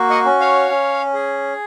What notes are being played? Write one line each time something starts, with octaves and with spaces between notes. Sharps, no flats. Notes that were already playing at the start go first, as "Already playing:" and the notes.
Already playing: A#3 F#4
D#5 F#5
C#4
C#5 F5
C#4
G#4